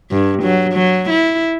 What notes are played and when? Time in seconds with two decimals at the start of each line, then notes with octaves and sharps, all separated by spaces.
0.11 G2
0.43 F#3
0.73 F#3
1.10 E4